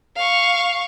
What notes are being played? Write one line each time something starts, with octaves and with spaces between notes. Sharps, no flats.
F5 C#6